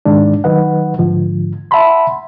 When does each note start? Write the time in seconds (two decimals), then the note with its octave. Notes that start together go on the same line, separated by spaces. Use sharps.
0.05 G#2 D#3 G#3 D4
0.44 D#3 F#3 B4 D#5 F#5
0.99 G#2 D3 F3
1.71 E5 F#5 A5 B5 C6